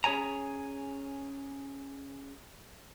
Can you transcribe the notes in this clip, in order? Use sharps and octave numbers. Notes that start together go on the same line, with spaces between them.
C#4 G#4 C#5 G#5 A#5